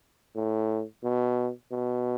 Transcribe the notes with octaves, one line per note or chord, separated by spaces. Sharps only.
A2
B2
B2